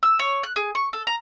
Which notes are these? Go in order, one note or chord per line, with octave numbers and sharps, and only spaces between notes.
E6
C#5
F#6
G#4
C#6
A4
A#5